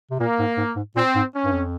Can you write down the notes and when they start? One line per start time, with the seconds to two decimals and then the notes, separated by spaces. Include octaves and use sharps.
0.11 C3
0.19 A#2 A#3
0.39 G#2
0.57 G#2
0.76 G#2
0.95 A#2 C4
1.15 G#2
1.34 C#4
1.45 G2
1.52 F2